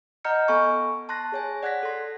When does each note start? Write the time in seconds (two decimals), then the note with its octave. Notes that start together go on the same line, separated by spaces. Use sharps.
0.25 D#5 F#5 A#5 F6 G6 C#7
0.48 B3 A4 G#5 B5 C#6
1.09 A5 C6 F#6 A#6
1.32 G#4 C#5 G#5
1.63 D5 F#5 F#6 G#6 A#6 B6
1.83 A4 C6